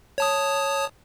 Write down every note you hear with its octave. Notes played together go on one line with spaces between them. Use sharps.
C#5 A5 D#6